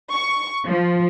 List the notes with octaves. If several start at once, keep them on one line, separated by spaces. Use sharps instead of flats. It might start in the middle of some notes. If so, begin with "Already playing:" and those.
C#6
F3